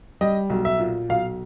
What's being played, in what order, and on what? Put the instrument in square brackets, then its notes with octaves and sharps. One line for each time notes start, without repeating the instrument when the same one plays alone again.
[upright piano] G3 D#5
B1
E5
A#2
B1 F5